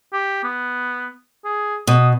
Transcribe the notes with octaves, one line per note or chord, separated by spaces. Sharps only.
G4
B3
G#4
B2 D#6